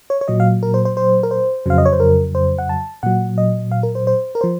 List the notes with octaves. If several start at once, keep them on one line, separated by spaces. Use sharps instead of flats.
C#5
C#5
A#2 F#3 D#5
F5
A#4
C5
C5
C5
A#4
C5
F2 C#3 F#3 F5
D#5
C#5
C5
A#4
C5
F#5
A5
A#2 F#3 F#5
D#5
F5
A#4
C5
C5
A#4
F3 C5